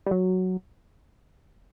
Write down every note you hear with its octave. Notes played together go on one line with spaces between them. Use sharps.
G3
F#3